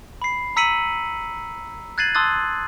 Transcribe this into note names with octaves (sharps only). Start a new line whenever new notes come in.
B5 C7
A#5 E6 B6 C#7 D#7 F#7
F#6 G#6 A6 C7 D#7 F#7
A5 C6 D#6 E6 F#6 A6